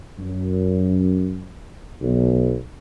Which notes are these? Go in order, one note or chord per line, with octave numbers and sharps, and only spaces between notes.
F#2
B1